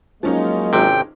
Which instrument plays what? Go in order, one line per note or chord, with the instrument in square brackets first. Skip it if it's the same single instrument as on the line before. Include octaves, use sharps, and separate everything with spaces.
[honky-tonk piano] F3 C#4 D#4 [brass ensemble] F#3 G#3 A#3
[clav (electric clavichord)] G#1 C3 [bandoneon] G5